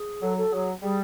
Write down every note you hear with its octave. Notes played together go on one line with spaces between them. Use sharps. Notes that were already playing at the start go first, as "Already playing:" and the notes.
Already playing: G#4
F#3 A4
A4
F#3 G#4
G3 G#4